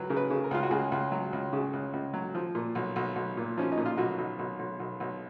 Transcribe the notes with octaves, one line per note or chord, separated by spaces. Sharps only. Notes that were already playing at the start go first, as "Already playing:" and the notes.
Already playing: C#2 F#3 B4
C#3 A#4
B4
C#3
A#4
C#2 F4
F#4
C#2 G#4
C#2
F#3
C#2
C#3
C#2
C#2
F#3
F3
A#2
B1
B1
B1
A#2
F3 C#4
D#4
A#2
F4
B1 F#4
B1
B1
B1
B1
B1